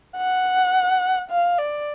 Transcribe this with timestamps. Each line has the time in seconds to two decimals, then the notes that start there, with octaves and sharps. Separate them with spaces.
0.17 F#5
1.30 F5
1.58 D5